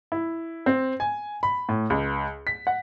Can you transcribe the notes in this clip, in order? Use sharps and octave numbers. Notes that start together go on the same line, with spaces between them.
E4
C4
G#5
B5
A2
C#2
B6
F#5